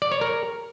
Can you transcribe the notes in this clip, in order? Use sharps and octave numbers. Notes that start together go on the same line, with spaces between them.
D5
C#5
A#4